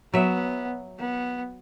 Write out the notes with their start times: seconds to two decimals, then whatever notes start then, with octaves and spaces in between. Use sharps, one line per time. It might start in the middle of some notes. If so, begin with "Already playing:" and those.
0.14 F#3 B3 E5
0.99 B3